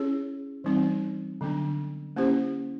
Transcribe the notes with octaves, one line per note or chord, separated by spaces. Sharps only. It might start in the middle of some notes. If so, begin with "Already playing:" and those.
Already playing: C#4 E4 G#4 C#5
E3 G3 C4 D#4
D3 F#3 B3 D4
A#3 C#4 E4 G4 C5